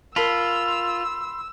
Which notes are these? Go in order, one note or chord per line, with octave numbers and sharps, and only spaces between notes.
F4 A#4 A5 B5 C6 E6